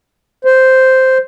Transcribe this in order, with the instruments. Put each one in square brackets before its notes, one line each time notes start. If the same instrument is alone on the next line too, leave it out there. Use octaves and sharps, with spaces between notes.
[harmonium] C5